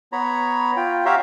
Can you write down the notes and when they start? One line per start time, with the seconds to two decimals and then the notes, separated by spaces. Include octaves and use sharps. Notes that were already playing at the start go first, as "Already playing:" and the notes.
0.12 B3 C#5 A#5 B5
0.77 F4 G5
1.06 F#4 G4 C#5 E5 F5 A#5